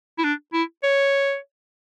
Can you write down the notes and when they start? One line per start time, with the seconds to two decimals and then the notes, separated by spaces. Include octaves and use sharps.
0.18 E4
0.24 D4
0.53 E4
0.83 C#5